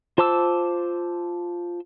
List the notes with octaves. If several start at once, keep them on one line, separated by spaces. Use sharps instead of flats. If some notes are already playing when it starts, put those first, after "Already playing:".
F4 C5 A5 D6 E6